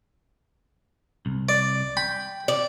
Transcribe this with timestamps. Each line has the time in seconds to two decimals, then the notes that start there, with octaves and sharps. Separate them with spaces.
1.26 C2
1.49 D5
1.97 G5 B5
2.48 D5